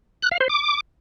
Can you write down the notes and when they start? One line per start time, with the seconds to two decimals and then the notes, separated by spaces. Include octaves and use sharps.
0.22 F#6
0.31 F5
0.40 C5
0.49 D6